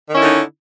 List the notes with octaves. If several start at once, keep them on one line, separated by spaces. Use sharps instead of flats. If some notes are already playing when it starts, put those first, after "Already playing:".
D3 D#3 C#4 D#4 E4